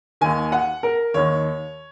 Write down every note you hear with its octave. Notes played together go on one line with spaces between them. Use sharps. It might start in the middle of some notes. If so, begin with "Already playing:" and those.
D#2 D#3 G#5
F#5
A#4
D#2 D#3 C#5